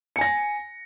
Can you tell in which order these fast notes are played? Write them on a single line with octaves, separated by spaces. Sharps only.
C#7 G#5 A#6